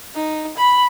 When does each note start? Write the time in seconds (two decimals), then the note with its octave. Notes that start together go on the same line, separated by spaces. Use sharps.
0.15 D#4
0.58 B5